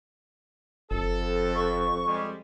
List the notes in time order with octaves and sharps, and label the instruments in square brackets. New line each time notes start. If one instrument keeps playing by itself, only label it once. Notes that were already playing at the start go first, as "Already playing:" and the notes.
[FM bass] F#1 [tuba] F2 [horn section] A4
[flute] C#6
[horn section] G3 G#3